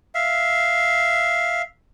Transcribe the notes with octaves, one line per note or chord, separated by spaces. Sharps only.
E5 F5